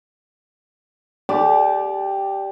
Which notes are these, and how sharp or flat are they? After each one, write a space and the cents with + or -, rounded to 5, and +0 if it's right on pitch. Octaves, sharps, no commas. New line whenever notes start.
G4 +0 D5 +0 A5 -40